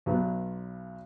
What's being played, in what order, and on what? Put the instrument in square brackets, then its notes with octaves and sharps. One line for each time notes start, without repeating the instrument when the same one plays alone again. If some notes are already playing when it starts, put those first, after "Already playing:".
[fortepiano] B1 F#3 B3